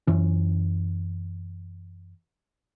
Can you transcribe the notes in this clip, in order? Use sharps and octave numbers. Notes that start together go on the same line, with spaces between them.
F#2 E3 C#4